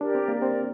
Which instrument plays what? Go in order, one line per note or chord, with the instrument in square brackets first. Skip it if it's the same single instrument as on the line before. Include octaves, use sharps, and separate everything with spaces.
[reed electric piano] D4 [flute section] G4 A#4 D5
[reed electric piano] C4
A#3
[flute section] G4 A#4 D5
[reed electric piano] C4